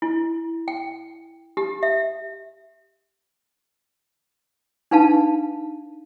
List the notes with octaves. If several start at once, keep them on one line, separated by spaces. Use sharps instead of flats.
E4
G5
G4
E5
D4 D#4 B4 F5 A5